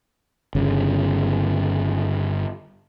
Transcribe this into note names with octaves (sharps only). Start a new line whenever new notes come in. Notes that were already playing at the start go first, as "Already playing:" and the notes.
G1 C#3